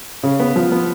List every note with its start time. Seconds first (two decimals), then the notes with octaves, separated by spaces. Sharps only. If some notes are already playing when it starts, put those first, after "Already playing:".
0.23 C#3
0.40 B3
0.56 F3
0.72 B3